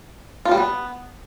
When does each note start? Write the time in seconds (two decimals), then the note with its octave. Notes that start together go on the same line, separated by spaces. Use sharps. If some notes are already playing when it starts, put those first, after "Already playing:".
0.45 F4
0.51 G3
0.57 B3